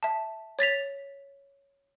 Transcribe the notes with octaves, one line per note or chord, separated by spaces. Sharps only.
E5 A5
C#5 A6 B6 F7